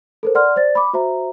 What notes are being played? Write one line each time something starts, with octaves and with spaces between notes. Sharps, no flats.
A4 A#4 C5
D5 F#5 C6 F6
C5 D5 A6
B5 D6
F#4 C5 E5 A#5